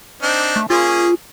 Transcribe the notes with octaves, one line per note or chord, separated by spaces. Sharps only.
C4 D4 D#4
A3
A#3 C#4 F4 G#4